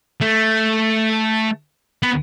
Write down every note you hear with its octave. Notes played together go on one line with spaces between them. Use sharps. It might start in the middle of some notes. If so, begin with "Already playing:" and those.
A3
B3